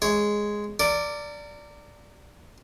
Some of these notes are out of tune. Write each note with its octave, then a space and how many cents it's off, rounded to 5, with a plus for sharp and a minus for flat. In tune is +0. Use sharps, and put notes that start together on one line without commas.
G#3 +0 C#5 +0
A#4 -30 D5 +0